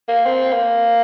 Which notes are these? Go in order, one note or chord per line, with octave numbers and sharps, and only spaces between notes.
A#3
C4
A#3